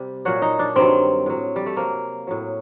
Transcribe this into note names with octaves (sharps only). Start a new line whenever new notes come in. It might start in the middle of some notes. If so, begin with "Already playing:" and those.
Already playing: C3 G3
A#2 F#3 F#4
D#4
D4
G2 D#3 F#3 C4
A2 F#3
G3
A3
C3 F#3 A#3
A2 F#3